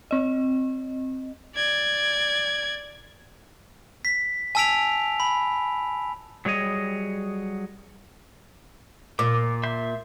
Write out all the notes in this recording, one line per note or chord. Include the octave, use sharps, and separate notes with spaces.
C4 D#5
D5 G#6
B6
G#5 A5 E6 B6 D7 F7
B5
F#3 G3 G#4 C#5 D#5
A#2 D6
E5 C6 G6